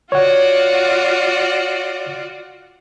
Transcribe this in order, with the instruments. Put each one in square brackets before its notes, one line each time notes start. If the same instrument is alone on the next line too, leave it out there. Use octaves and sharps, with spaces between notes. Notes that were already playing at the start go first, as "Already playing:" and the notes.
[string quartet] F4 F#4 D5 [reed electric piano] C#5 F#5